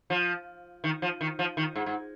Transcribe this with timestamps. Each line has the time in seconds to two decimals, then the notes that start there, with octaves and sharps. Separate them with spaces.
0.10 F3
0.84 D#3
1.02 F3
1.21 D#3
1.39 F3
1.57 D#3
1.76 G#2
1.86 G#2